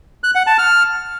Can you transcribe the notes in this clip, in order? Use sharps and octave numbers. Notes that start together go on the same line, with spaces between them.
F#6
F#5
A5
F6